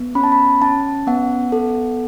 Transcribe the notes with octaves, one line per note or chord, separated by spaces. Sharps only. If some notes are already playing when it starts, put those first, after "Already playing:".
Already playing: B3
C#4 B5
A5
B5
C#4 A5
B3 F#5
A4